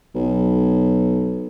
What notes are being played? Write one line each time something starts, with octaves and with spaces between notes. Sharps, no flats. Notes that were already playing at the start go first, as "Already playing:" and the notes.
B1